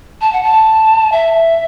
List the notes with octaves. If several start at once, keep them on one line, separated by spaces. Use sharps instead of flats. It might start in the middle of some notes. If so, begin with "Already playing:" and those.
A5
F#5
A5
E5